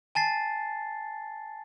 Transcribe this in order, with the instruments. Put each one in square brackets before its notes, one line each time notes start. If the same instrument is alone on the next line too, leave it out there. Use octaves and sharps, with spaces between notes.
[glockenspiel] G#5 A5 A6 C7